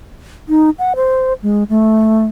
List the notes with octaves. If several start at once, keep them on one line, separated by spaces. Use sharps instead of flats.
D#4
F#5
C5
G#3
A3